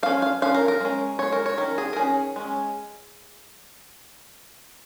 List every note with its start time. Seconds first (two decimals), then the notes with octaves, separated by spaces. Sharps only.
0.03 F3 C#4 F5
0.22 F5
0.42 F3 C#4 F5
0.54 A#4
0.68 A#4
0.80 G#3 C#4
1.19 G#3 C#4 C#5
1.32 A#4
1.46 C#5
1.58 D#3 C#4 A#4
1.78 G#4
1.93 A#4
1.96 D#3 C#4 G#4
2.36 G#3 C#4